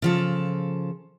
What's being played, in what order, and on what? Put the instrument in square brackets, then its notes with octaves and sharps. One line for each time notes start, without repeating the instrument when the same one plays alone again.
[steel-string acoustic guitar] C#3 F3 A4